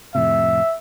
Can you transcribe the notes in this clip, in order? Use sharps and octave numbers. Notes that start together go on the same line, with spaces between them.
F2 A2 C3 E5